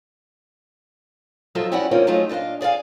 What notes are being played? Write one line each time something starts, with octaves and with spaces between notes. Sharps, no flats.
F3 F#3 D#4 F4 A4 E5
C4 C#4 E4 F#4 D5 F#5
A2 D#3 A#3 C4 C#4 F4
F#3 A3 C#4 D#4 F4
A#2 D4 B4 D#5 F5
G#4 D5 D#5 F5 G#5